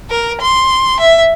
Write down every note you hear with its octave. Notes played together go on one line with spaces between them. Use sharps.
A#4
C6
E5